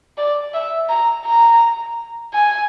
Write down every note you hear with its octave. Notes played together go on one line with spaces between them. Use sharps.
D5
E5
A#5
A#5
G#5